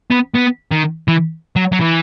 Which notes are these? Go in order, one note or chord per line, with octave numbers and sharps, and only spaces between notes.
B3
B3
D#3
E3
F#3
F#3
E3